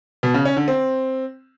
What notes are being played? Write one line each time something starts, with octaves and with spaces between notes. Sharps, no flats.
B2
C#3
C#4
D3
C4